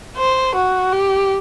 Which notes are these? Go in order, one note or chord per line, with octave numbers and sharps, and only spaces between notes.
C5
F#4
G4